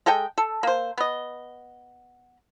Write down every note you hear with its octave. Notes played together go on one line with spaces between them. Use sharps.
G#3 A4 D#5 G5
A4
A#3 C5
B3 D#5